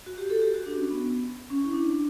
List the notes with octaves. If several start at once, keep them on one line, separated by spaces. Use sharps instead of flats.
F#4
G4
A4
G4
F#4
D4
C#4
B3
C#4
E4
D4